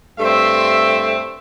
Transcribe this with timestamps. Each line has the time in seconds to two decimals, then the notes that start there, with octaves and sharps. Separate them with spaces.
0.20 G2 A3 C4 E5 C6